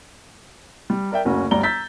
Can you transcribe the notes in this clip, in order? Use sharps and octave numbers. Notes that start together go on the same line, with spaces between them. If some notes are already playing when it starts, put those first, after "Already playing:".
G3
A#4 D5 E5 G5
F#1 D2 C#4 F#4
G1 D2 G3 D5 A#5 G7
A#5 E6 G6 A6 B6